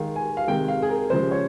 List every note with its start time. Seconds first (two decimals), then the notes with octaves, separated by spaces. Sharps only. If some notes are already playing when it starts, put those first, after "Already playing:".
Already playing: D#3 G#3 F5
0.16 G#5
0.37 F5
0.48 C3 D#3 G#3 G5
0.68 F5
0.82 G#4
0.89 A#4
1.10 C#3 F3 G#3 C5
1.31 C#5